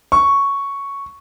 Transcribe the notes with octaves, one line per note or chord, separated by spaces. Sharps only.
C#6